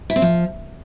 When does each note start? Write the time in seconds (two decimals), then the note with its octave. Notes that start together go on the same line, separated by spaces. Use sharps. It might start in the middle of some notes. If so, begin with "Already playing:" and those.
0.10 E4
0.16 C4
0.22 F3